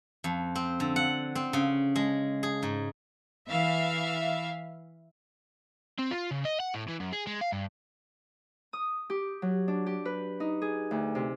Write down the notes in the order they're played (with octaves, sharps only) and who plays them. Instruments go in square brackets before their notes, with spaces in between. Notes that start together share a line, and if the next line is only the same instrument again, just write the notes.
[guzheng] F2
C4
D3
F#5
C4
C#3
G#3
G#4
G#2
[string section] E3 E5 F5
[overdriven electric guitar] C4
F4
C#3
D#5
F#5
A2
E3
F#2
G#4
G#3
F5
G2
[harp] D#6
G4
F#3
D4
G4
B4
D#4
G#4
D2
C3